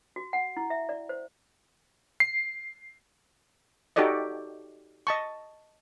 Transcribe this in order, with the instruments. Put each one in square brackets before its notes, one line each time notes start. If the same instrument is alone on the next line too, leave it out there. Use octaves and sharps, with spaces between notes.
[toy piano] F#4
F#5
E4
E5
D5
C5
[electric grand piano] C7
[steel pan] D#4 F#4 G4 A4 D5 D#5
D#5 A5 C#6